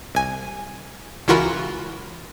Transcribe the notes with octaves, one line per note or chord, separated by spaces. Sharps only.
C2 G#5
C#2 E3 F4 F#4 A#4 B5